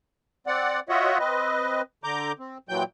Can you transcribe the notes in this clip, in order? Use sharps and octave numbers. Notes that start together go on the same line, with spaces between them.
C4 D5 F#5
F4 F#4 C#5 D#5 E5 F#5
C4 B4 D#5
D3 A#5 D6 G6
C4
A#2 E3 F#3 G5 G6